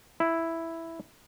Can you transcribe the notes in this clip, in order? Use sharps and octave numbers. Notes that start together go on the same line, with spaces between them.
E4